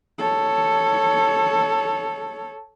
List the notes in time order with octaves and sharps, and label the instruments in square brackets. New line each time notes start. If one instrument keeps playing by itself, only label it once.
[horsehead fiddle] A4 C#5